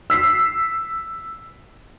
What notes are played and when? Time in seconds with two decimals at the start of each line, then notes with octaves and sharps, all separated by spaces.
0.10 E6 B6 C7